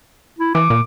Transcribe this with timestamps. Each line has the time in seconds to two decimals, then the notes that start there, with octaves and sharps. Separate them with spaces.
0.39 E4
0.55 E3 D6
0.70 A#2